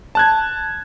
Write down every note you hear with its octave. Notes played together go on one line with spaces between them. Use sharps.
A5 F#6 G#6